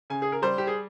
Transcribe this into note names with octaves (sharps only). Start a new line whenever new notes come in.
C#3 G#5
G#4
A#4
G3 C5
G4
G#4